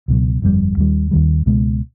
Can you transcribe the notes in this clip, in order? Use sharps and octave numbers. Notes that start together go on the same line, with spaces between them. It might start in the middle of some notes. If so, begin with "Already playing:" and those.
C#2 B2 F#3
G1 F2 D3 G3
D#2 D#3 G3
D#2 D#3 G3
C#2 B2 G#3